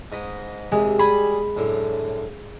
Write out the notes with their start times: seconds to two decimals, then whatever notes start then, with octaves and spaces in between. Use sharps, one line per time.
0.12 G#2 D#5 B5
0.72 D#2 C3 G#3
0.99 G3 G#4 G#5 B5
1.57 F#2 A2 D3